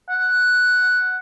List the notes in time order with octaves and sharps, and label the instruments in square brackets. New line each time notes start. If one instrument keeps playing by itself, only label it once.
[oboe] F#5